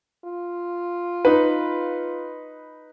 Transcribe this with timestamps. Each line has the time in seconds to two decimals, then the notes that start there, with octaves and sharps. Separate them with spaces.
0.25 F4
1.25 D#4 B4